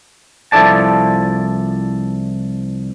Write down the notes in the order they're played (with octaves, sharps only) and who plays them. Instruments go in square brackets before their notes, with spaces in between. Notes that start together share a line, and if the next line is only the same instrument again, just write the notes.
[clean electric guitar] C2 F3 E4 A4 D5 A5